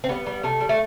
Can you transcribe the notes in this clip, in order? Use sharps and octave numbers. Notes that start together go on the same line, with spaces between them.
C4
G3 B3
G3
C3 A3
G3
A3